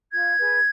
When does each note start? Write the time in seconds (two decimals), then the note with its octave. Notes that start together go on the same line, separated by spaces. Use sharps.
0.11 F4 G#6
0.38 G#4 B4